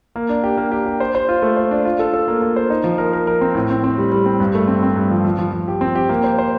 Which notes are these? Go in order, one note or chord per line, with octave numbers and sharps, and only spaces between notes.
A#3
D4
G4
A#3
G4
G4
C5
C5
F4
A3
C5
D4
F4
A4
A4
A#3
A#3
C5
D#4
F3
A#4
A#4
A#4
C4
A2
C4
C4
G3
G3
C4
G2
A3
C4
C4
G2
F3
F3
F3
F3
G4
C4
G4
A#3
C5
C5